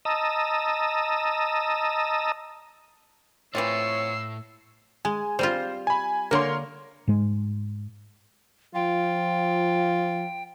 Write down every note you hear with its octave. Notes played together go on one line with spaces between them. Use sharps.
D#5 A5 A#5 D#6 E6
A2 E3 C4 F4 C#5 E6 C7
G#3 G#5
G3 C4 F4 C5
G#5 B5
D3 A#3 A#4 C#5 C6
G#2 G#3
F3 F4 G5